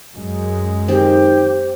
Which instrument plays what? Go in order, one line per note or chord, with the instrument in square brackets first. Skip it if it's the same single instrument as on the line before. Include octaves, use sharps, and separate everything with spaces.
[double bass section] F#2 G#3
[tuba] D#3 [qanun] C4 [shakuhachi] G4